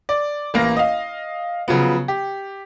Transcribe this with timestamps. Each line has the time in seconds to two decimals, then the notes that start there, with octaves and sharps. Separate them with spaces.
0.09 D5
0.54 A1 A#3 A#6
0.77 D#5 F5
1.68 C#3 F3 F#3 B3
2.08 G4